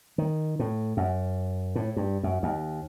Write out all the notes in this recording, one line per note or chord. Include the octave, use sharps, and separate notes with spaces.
D#3
A2
F#2
A2
G2
F#2
D#2